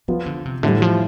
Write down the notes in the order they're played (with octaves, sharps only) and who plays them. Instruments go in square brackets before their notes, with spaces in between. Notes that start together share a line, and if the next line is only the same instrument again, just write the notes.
[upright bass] E3 [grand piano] F3 B3 F4
[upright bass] D3
C3
[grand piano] A2 E3 G3 [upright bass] D3
[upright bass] F3